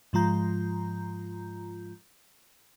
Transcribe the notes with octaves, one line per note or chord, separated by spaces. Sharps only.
G#2 F3 G#3 F4 A#5 G6